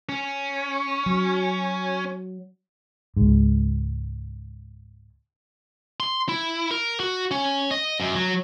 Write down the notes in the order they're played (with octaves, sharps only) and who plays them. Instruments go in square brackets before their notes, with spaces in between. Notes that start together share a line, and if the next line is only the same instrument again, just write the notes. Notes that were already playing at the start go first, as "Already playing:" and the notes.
[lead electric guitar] C#4
[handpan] F#3
[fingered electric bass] C#2 G#2
[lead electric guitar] C6
E4
A#4
F#4
C#4
D#5
F#2
F#3